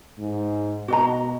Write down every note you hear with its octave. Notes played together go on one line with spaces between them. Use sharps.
G#2
B2 F#4 D#5 A#5